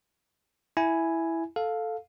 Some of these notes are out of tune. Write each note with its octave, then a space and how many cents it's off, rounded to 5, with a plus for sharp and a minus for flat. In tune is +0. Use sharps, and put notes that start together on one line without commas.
E4 +0 G#5 +0
A4 +0 F5 +10